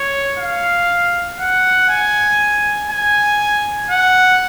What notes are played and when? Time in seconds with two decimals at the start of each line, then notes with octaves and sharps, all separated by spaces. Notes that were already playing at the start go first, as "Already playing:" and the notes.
Already playing: C#5
0.38 F5
1.39 F#5
1.89 G#5
2.90 G#5
3.90 F#5